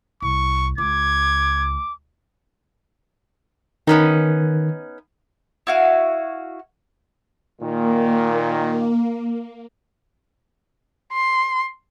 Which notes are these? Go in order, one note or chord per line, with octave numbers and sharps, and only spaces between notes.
C2 C#6
C#2 D6 G#6
D#3 B3 C#4 D#4
E4 F#4 F5
A#2 D#3 A#3
C6